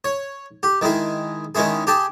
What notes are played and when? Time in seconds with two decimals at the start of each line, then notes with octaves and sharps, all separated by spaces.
0.04 C#5
0.63 G4
0.81 D#3 G#3 E4 G#4
1.55 D#3 G#3 C#4 E4 G#4
1.87 G4 G#4 G5 A5